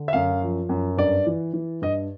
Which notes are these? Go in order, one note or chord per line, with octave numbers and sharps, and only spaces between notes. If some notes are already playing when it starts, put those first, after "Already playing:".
Already playing: D3
E5
F#2 F5
F3
F#2
G2 D5
E3
E3
G2 D#5